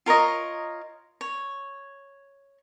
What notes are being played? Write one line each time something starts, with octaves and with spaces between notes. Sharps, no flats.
F4 A#4 C#5 D#5
C#5